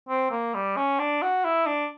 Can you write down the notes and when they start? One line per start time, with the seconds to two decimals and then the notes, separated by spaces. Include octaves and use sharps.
0.09 C4
0.31 A#3
0.54 G3
0.76 C#4
0.99 D4
1.22 F#4
1.45 E4
1.66 D4